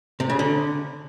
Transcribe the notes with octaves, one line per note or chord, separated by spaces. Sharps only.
C3
C#3
D3